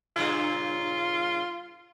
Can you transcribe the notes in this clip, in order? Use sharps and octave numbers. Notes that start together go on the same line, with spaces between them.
G2 A#2 C#3 F4